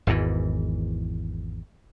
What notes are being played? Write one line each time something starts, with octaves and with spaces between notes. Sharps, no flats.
G#1 E2 G#2 E3